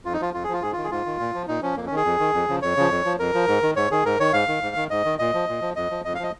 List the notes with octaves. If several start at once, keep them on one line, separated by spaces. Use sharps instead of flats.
F2 F4
D#4
F3 F4
F2 F4
G#4
F3 F4
G#2 G#4
D#3 F4
G#4
G#2 F4
D#3
A#2
F3
A#2 D#4
F3 C#4
F2 A#3
C#4
D#3
G#4
F2
D#3
F2
C#3 F3
F2 C#5
C#3 F3
F2
F3
F2 A#4
F3
G#2
D#3
G#2 C#5
D#3 G#4
G#2 A#4
D#3 C#5
G#2 F5
D#3
G#2
D#3
G#2 D#5
D#3
A#2 D#5
F3
A#2
F3
F2 D#5
F3
F2 D#5
F5
F3 D#5